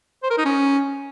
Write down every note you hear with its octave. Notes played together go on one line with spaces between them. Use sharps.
C5
A#4
D#4
C#4